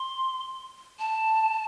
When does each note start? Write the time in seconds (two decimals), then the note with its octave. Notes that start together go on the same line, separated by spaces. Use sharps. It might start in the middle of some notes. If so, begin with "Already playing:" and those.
Already playing: C6
0.99 A5